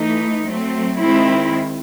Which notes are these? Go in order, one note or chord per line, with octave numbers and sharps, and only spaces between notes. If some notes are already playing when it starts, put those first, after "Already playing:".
Already playing: E3 A3 D#4
F#3 A3 C4
D#3 G#3 C4 E4